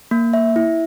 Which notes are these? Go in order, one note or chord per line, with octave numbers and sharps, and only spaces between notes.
A#3
E5
E4